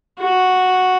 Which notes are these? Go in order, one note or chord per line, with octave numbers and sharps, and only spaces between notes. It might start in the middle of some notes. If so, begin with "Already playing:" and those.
F#4